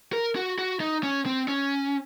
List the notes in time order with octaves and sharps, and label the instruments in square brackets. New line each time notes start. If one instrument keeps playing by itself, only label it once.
[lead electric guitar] A#4
F#4
F#4
D#4
C#4
C4
C#4